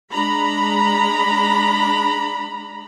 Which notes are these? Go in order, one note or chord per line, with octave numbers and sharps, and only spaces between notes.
G#3 D4 A#5 B5